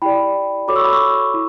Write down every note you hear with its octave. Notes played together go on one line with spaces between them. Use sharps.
E4 G4 D5 G5 B5
F#4 A4 C#5 B5 D6
C#6 E6
B5 D6
C#6 E6
E4